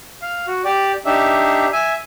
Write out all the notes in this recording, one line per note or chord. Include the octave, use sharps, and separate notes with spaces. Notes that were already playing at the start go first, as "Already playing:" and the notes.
F5
F#4
G4 D5
D4 D#4 G4 E5
E5 G#5